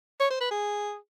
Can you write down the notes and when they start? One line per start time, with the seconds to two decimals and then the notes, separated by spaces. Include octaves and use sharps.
0.20 C#5
0.30 C5
0.41 B4
0.51 G#4